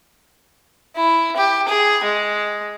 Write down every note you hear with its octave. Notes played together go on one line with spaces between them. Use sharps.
E4
G4
G#4
G#3